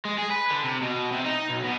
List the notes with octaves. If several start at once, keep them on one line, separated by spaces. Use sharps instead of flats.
G#3
G#4
B4
D3
C3
B2
C3
D#4
B1
B2